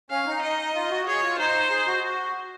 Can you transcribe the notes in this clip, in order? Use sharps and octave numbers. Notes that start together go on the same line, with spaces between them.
C#4 F5
D#4
D#5
F4
F#4
G#4 C#5
F4
D#4 C5
G#4
F#4
F#4